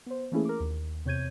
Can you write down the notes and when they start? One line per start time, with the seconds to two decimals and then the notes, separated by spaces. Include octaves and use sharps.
0.06 B3 C5
0.32 E3 A3 A#3 C#4 E4 G#4
0.45 A#4 D6
0.60 D#2
1.05 E2 C3 C#5 G6 G#6 D#7